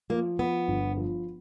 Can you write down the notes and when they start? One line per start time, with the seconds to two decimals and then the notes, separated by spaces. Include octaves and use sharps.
0.10 F3 A#3
0.39 F3 B3
0.68 G1
0.97 F3